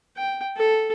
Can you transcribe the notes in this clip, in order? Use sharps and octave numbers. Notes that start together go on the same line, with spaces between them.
G5
A4